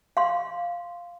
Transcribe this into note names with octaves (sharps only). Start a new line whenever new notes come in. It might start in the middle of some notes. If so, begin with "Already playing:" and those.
F5 C6